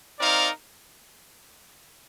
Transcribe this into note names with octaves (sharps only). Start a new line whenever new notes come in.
C4 D#4 A#4 D5 F5